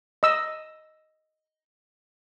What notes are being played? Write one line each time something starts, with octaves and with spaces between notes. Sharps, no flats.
D#5 E6